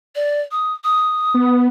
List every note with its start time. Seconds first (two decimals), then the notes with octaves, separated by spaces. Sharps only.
0.15 D5
0.51 D#6
0.84 D#6
1.34 B3